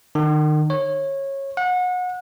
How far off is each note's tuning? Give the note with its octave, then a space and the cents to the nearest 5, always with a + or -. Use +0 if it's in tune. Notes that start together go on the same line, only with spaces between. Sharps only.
D#3 -35
C#5 -20
F#5 -30